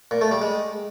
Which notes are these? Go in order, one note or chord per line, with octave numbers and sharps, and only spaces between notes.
A#2
A3
G3
G#3